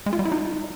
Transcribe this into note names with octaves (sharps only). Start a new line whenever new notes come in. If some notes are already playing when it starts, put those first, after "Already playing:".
G#3
F4
G3
E4
D#4